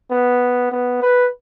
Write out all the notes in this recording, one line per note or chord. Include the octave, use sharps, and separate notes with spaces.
B3
B3
B4